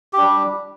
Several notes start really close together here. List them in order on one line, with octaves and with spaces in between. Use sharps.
G4 D4 G3